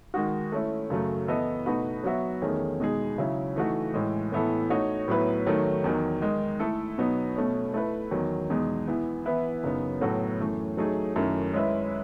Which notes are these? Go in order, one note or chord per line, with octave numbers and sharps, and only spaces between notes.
D#3 G#3 D#4 F#4
A3 C#4 E4
F#2 C#3 F#3 A3
E3 B3 E4 A4 D#5
B2 A3 D#4 F#4 B4
F#3 B3 F#4 C#5 E5
E2 D#3 A3 C#4 G#4
B2 G#3 D#4 G#4
C#3 F#3 C#4 E4
E3 A3 D#4 F#4
A2 E3 G#3
A2 E3 B3 E4 A4
A3 D#4 F#4 C#5
A2 F#3 B3 E4 B4
D#3 F#3 A3 D#4
E2 D#3 F#3
D#3 G#3 D#4
A3 E4 A4
B2 F#3 B3 D#4
B2 A3 C#4
A3 E4 B4
E2 D#3 F#3
E2 B2 G#3 D#4 G#4
E3 B3 E4
E3 B3 E4 B4 E5
F#2 C#3 F#3 B3 D#4
A2 F#3 B3 F#4 A4
F#2 E3 A3
F#3 A3 D#4 G#4
F#2 D#3 A3 E4
G#3 C#4 E4 B4 E5